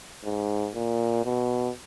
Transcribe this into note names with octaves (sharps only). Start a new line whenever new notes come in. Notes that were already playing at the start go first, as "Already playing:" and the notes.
G#2
A#2
B2